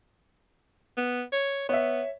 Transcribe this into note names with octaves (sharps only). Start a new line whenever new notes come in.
B3
C#5
B3 C#5 E5